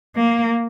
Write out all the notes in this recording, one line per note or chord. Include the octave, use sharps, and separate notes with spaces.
A#3